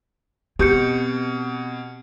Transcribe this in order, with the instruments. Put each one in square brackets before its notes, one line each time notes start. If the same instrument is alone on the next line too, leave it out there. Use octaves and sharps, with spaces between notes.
[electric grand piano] B2 [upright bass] C4 [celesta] G4 G6 C#7